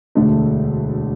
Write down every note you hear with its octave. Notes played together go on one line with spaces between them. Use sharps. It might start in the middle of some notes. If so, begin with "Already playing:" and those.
E1 D2 D3 A3 D4